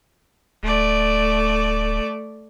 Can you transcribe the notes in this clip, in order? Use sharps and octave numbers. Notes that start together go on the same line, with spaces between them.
D1 A3 D5